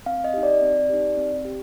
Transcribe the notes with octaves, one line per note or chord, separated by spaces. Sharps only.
C4 F5
D#5
D#4 G4
D5
C4
D#4 G4
C4
G4